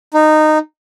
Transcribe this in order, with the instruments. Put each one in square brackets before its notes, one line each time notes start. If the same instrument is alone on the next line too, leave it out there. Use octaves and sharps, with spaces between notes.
[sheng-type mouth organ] D#4